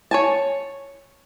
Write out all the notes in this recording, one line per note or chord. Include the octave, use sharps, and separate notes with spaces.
C#5 G#5 A5